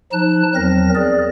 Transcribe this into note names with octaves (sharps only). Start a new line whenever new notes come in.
F3 D#4 A5 F#6
E2 F#3 C4 A#4 A#6
G#4 A#4 D5